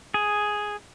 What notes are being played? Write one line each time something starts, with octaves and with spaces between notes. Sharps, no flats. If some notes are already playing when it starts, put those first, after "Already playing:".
G#4